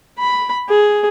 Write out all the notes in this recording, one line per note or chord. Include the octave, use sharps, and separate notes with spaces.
B5
G#4